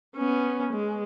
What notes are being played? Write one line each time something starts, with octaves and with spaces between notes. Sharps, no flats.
B3 C#4
G#3